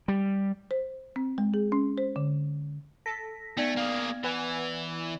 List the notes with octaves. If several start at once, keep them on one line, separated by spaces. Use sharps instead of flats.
G3
C5
C4
G#3
G#4
C#4
C5
D3
A4 A#6 B6
A3 B3 D5 G#6
A#3 G#4 F5
E3 B4 F#5 G#5